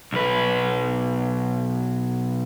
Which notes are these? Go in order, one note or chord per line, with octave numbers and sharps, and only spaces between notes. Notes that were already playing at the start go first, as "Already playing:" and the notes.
B1 B4